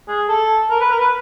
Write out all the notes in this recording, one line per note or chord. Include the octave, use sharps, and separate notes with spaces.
G#4
A4
A#4
B4
A#4
B4